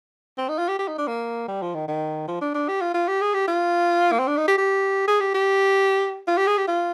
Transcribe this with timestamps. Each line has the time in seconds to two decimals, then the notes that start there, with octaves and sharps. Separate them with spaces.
0.38 C4
0.49 D#4
0.58 F4
0.68 G4
0.79 G4
0.88 D#4
0.98 D4
1.08 A#3
1.48 G3
1.62 F3
1.75 D#3
1.88 D#3
2.28 F3
2.42 D4
2.55 D4
2.68 G4
2.81 F4
2.94 F4
3.08 G4
3.21 G#4
3.34 G4
3.48 F4
4.12 A#3
4.19 C4
4.28 D4
4.37 D#4
4.48 G4
4.58 G4
5.08 G#4
5.20 G4
5.34 G4
6.28 F4
6.38 G4
6.47 G#4
6.58 G4
6.68 F4